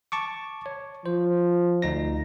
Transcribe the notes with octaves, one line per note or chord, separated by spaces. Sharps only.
A5 C#6 D6
C#5
F3 C5
D2 D#4 A#6